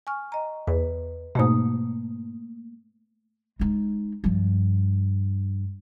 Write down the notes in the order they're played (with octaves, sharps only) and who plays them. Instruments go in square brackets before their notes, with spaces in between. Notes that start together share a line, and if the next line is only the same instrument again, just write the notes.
[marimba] G#5 C#6 F6
D#5 A#5
[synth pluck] E2 [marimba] B4
[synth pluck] G#2 B2 [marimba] A3 A#3 D#6
[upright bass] G#3 D#4
G2 F3